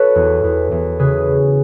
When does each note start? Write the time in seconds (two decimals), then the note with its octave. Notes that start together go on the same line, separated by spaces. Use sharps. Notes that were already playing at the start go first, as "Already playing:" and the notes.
Already playing: F#4 A4 B4 C#5
0.15 E2
0.44 E2
0.71 E2
0.99 C#3 G#4 B4